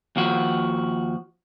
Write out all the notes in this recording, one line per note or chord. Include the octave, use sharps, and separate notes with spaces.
D#2 F3 F#4